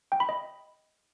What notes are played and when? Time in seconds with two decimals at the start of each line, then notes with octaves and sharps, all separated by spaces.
0.12 G5
0.20 B5
0.29 D#5